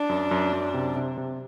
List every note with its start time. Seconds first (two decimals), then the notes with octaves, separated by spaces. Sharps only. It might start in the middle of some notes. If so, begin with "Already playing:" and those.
Already playing: D4
0.09 F#2
0.31 F#2
0.53 F#2
0.74 C3
0.96 C3
1.17 C3